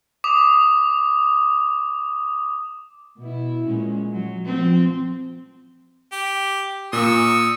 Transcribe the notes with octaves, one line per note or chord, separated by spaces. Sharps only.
D6 D#6 F7
B2 E4
A#2 G#3 C#4
F#3
F3 C4
G4
A#2 C#6 D#6 E6